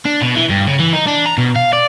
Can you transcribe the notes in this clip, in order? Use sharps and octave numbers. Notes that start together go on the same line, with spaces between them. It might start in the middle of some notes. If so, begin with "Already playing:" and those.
D4
B2
E3
G2
C#3
E3
D#4
D4
A#5
B2
F5
D5